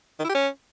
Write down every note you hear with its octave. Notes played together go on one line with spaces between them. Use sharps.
D#3
E4
G4
C#4